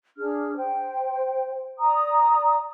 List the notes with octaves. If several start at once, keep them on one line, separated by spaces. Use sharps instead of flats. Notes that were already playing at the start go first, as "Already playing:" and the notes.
D4 G#4 F6
C5 G5
D5 A#5 D#6